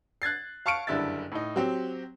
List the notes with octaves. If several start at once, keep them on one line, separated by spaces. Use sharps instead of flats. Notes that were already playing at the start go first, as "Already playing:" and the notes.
F#6 G#6 A6 C7
F5 A5 C#6 F6 C#7 D7
F#1 G2 D3 E4 E5 A6
A2 D#4
F#3 C4 G4